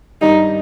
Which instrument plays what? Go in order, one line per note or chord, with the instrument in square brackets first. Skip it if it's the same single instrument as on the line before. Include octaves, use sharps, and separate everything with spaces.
[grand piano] G2 D#3 G3 [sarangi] D#4